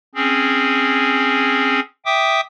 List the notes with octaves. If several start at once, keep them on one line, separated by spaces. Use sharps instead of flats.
C4 C#4 G#4
E5 G5 D6 D#6